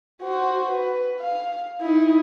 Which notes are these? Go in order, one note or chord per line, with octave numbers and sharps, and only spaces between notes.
F#4 C5
B4
F5
D#4 E4